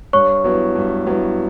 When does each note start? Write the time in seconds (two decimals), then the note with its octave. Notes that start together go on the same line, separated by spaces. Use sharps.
0.13 G2 C#5 C#6
0.44 F#3 B3 E4
0.76 G2
1.07 F#3 B3 E4